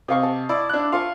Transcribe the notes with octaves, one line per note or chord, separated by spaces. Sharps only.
C3 D#5 F5 C#6
A5
E4 D5
D4 F#6
F4 F5 A5 C#6